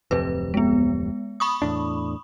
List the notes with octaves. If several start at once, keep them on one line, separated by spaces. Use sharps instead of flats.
D1 F2 C3 B4
G#3 B3
B5 C#6 D#6
E2 A2 D4